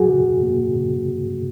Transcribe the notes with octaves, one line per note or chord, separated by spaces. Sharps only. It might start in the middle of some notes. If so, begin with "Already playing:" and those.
Already playing: F#3 F#4 G#4
C#3
A#3
C#3